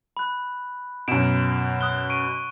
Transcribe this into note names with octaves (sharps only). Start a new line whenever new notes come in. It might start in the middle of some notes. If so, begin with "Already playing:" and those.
B5 F#6
F#2 B2 D7 E7
D#6 F#6 G7
C#6 D7 D#7